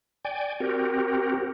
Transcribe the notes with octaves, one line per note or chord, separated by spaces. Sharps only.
D5 G5 G#5
C4 F#4 G4 A#4